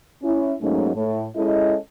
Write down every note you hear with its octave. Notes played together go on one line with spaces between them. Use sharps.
C#4 E4
G#2 F#3 A3 A#3 C#4 D#4
A2
G#3 C#4 E4 A4 D#5